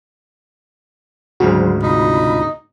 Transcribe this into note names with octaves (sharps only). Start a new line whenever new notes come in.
D2 G#2 C#3 F#3 F#4 G#4 C5
C3 D#4 F4 B5